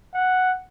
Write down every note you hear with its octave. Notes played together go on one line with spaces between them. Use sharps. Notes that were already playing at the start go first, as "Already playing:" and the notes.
F#5